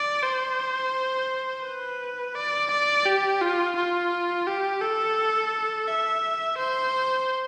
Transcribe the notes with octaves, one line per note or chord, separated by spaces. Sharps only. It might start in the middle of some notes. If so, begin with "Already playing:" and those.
Already playing: D5
C5
B4
D5
D5
G4
F4
F4
G4
A4
E5
C5